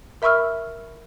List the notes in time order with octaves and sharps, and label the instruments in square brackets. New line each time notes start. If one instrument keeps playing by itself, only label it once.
[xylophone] A#4 E5 B5 C#6 E6 F6